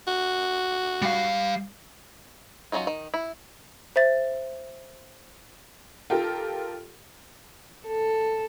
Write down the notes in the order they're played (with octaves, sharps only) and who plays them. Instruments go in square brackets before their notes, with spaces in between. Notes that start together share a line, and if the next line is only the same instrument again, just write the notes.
[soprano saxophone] F#4
[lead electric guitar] G3 F5
[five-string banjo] F#3 A3 C#4 D#4 F4
D#3
E4
[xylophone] C5 E5 A6
[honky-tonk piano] F4 G4 A4 A#4
[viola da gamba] A4